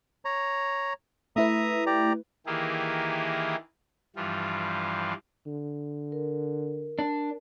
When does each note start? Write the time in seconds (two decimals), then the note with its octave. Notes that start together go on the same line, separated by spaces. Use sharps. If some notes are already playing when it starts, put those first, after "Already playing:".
0.25 C#5 A#5
1.36 A3 E4 B4 E5 A#5 D#6
1.86 G4 D5 A#5
2.46 D#3 E3 A#3 E4 G4 G#4
4.16 G2 E3 F3 G3 F4
5.47 D3
6.12 A#4
6.99 D4